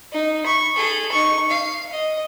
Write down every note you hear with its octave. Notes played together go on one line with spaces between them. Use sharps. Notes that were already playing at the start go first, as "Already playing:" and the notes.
D#4
B5 C#6
G#4 A4
D#4 C#6
F5
D#5